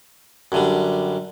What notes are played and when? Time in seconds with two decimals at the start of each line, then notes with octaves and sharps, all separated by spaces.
0.52 F#2 D3 G3